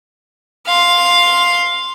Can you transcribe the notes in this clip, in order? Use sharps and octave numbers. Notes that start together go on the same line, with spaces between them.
F5 C6